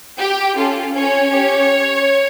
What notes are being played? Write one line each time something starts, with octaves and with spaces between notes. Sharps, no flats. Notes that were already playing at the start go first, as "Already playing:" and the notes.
G4 G5
C#4 F4 A4
C#4 C#5
C#4 G4